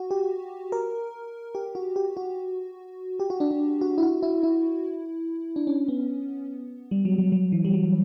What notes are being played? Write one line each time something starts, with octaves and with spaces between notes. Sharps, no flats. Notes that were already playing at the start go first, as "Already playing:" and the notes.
Already playing: F#4
G4
A#4
G4
F#4
G4
F#4
G4
F#4
D4
D4
F#4
E4
F#4
E4
E4
D4
C#4
B3
G3
F#3
F#3
F#3
E3
G3
F#3